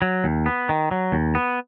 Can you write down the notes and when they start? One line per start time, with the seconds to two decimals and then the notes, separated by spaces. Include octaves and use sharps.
0.02 F#3
0.24 D#2
0.46 B3
0.69 D#3
0.91 F#3
1.12 D#2
1.35 B3